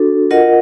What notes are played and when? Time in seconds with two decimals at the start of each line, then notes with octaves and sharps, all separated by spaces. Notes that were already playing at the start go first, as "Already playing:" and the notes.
Already playing: D4 F#4 A4
0.31 F4 A#4 D#5 F#5